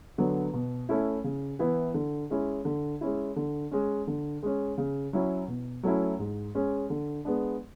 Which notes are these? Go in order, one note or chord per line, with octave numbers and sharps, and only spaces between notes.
D3 F#3 B3
B2
A3 C#4 E4
C#3
E3 B3 E4
D3
G#3 C#4 E4
D3
G#3 C#4 E4
D3
G#3 C#4
D3
G#3 C#4
C#3
F#3 C#4 E4
B2
F#3 A3 C#4 E4
G#2
G#3 C#4
D3
G#3 B3 D4